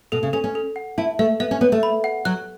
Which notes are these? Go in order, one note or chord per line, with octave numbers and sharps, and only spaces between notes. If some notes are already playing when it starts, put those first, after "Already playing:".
B2 A4
C#3
C#4 A4
C#4
A4
F#5
E4 A5
A3 E5
B3 E5
C#4
B3 C#5
A3
B5
F#5
F#3 F#6